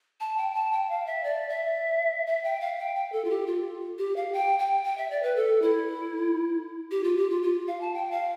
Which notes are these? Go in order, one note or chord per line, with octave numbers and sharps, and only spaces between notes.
A5
G5
A5
G5
F5
E5
D5
E5
E5
G5
F5
G5
G5
A4
F4
G4
F4
G4
F5
G5
G5
G5
E5
D5
B4
A4
E4
G4
F4
G4
F4
F4
F5
A5
G5
F5